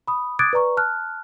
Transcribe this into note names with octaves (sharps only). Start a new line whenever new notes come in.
B5 D#6
D6 D#6 F#6 G#6 A6 D7
B4 D5 A#5 C#6
A5 F6 F#6